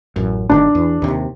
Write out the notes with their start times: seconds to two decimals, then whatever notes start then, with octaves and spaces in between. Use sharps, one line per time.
0.16 A1 F#2
0.50 G1 C3 D#3 D4
0.75 E2
1.02 D#2 C3